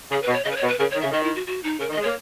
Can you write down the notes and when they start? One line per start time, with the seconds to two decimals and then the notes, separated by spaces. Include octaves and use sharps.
0.11 C#3 G#4
0.22 B4
0.28 B2
0.33 C#5
0.45 C#3 D#5
0.52 B4
0.57 C#5
0.63 B2
0.68 B4
0.79 C#3 A#4
0.90 C#5
0.95 D#3
1.01 C#3 E5
1.11 D#3 D#5
1.23 E4
1.35 F#4
1.47 F#4
1.64 D#4
1.79 C#3 A#4
1.89 D#3
1.92 D#5
1.97 G#3
2.03 A#3 C#5